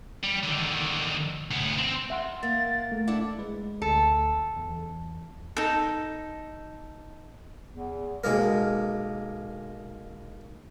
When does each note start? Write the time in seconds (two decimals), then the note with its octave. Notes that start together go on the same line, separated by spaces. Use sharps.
0.23 G3
0.43 D3 D#3
1.51 D2 B3
1.78 C4
2.10 E5 F#5 C6
2.43 A#3 A6
2.92 A3
3.07 D4 E4 F#5 D6
3.39 G#3 B4
3.82 D2 A4
4.57 E2
5.57 D#4 A4
7.70 E2
8.24 B1 G#3 A#3 A#4